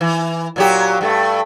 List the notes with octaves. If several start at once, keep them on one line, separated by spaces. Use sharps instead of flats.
E3
A#2 F#3 G4
G2 A3